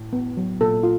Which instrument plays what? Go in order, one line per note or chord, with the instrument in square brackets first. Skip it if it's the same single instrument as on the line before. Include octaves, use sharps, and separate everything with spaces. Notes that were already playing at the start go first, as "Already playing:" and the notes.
Already playing: [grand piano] A2
[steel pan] B3
F#3
[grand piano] A#2 [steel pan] A4
[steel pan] F4